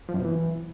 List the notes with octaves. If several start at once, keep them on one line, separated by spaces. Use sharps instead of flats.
F3
F#2
B2
E3